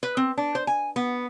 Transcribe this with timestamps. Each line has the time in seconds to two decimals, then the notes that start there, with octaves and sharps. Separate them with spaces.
0.03 B4
0.17 C4
0.38 D4
0.55 C5
0.67 G#5
0.96 B3